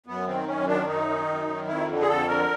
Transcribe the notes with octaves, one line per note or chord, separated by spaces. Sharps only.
F#2 B3
D#3 C4
F#2 C#4
D#3 D4
F#2 D#4
D#3
F#2
D#3
F2 E4
D3
G#4
F2 A4
D3 A#4